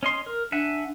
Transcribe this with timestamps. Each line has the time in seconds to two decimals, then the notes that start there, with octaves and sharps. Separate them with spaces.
0.03 C#4 D#5 C6
0.26 A#4
0.52 D4 E5 F#5 G#5